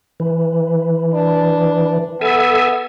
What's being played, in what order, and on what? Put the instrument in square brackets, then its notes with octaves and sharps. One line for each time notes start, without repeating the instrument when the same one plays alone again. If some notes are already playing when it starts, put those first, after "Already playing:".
[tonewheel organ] E3
[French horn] D4
[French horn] B3 [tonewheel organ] A4 E5 G#5